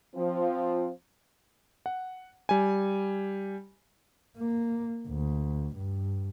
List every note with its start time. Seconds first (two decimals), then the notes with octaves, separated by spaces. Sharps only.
0.16 F3 C4
1.86 F#5
2.49 G3 G#5
4.38 A#3
5.08 D2
5.77 G2